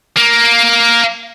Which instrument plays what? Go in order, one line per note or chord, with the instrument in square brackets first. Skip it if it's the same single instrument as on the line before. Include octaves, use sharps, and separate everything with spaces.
[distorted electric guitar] A#3